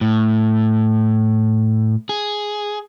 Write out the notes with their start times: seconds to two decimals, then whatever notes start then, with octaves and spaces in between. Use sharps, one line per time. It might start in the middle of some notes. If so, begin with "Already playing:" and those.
0.01 A2
2.09 G#4